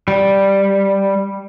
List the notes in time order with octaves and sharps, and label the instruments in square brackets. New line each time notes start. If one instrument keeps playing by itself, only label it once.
[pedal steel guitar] G3